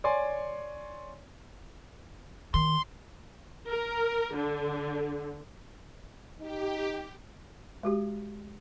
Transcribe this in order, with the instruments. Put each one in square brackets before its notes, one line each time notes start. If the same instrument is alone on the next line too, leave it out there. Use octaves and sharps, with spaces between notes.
[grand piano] C#5 D5 G#5 C6
[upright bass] D#3 [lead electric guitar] C6
[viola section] A#4
D3
[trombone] D#4 [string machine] G4
[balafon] G#3 F#4 G4